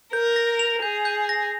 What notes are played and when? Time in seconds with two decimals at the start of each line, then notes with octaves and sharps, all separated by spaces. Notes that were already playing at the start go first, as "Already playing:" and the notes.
0.13 A#4 G6
0.36 A#6
0.59 F7
0.82 G#4 G6
1.05 G6
1.29 A#6